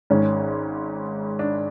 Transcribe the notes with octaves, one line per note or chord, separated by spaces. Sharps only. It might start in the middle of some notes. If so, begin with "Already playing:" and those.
G#1 G#2 D#3 C#4
D4